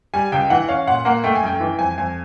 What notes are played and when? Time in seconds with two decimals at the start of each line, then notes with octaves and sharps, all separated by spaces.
0.14 G3 G#5
0.32 C#2 G5
0.50 E3 F#5
0.68 C#4 F5
0.87 A#2 F#5
1.05 A#3 F#5
1.24 A3 G5
1.35 G#5
1.43 F#2 G5
1.60 E3
1.79 F2 G#5
1.98 F2 G#5